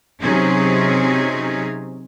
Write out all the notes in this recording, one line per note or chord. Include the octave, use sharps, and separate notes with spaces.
C3 F#3 C4 C#4 D#4 G#4